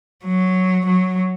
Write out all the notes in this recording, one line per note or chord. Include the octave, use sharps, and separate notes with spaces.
F#3
F#3